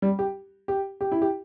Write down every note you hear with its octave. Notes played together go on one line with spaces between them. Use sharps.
G3
G4
G4
G4
E4
G4